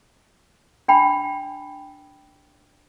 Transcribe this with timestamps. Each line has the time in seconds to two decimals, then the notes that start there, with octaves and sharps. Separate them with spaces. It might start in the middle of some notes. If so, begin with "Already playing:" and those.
0.88 D4 G5 B5